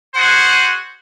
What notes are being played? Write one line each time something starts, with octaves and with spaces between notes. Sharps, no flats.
F#4 G#4 C5 F#5